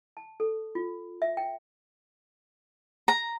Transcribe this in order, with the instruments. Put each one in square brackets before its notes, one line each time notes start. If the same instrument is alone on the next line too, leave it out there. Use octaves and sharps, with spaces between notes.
[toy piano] A5
A4
F4
E5
G5
[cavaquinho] A#5